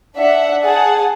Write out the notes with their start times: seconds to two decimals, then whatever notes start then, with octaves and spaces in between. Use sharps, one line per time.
0.15 D4 E5 F#5
0.64 G#4 F#5 A5